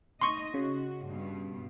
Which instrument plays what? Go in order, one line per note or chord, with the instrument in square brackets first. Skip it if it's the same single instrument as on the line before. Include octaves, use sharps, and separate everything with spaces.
[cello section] A3 D#4 D#5 [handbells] C6 C#6
[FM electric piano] C#3 [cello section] F#4
[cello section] G2 B2